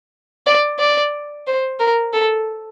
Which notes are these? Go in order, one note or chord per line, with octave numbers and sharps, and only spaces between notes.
D5
D5
C5
A#4
A4